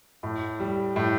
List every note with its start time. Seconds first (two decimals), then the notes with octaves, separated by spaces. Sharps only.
0.23 A2
0.59 G3
0.96 A2